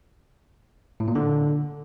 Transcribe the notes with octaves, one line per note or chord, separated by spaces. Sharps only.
A2
A#2
D3